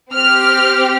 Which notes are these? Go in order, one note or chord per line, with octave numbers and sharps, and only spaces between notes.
C4 G4 F6